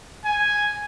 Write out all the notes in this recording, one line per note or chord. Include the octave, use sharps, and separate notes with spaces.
G#5